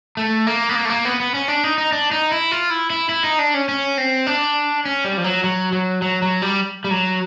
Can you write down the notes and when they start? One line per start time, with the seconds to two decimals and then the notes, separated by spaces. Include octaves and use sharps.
0.17 A3
0.47 A#3
0.69 B3
0.75 A#3
0.85 A3
0.89 A#3
1.05 B3
1.20 B3
1.34 C#4
1.48 D4
1.64 D#4
1.78 D#4
1.92 D4
2.11 D#4
2.32 E4
2.51 F4
2.70 E4
2.90 E4
3.09 E4
3.24 D#4
3.39 D4
3.54 C#4
3.69 C#4
3.98 C4
4.27 D4
4.85 C#4
5.04 G3
5.17 F3
5.24 F#3
5.44 F#3
5.72 F#3
6.02 F#3
6.22 F#3
6.42 G3
6.84 G3
6.91 F#3